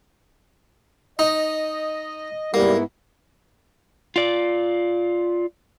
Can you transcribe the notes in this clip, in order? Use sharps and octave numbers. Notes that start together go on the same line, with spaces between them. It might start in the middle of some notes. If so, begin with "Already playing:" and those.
D#4 D#5
G#2 G3 A#3 B3 E4
F4 D5